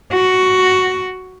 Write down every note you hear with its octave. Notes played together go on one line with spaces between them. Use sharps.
F#4